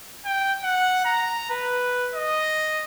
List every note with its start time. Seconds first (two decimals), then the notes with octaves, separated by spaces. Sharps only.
0.25 G5
0.63 F#5
1.05 A#5
1.50 B4
2.14 D#5